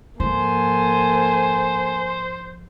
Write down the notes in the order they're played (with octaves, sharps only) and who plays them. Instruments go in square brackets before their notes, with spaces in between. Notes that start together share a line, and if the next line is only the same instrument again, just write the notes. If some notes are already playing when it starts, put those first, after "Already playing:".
[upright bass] G#2 F3 [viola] A#3 A4 [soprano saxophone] C5 [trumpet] G#5